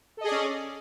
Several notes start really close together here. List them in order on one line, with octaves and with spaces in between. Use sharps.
A4 D#5 G#4 D5 C#4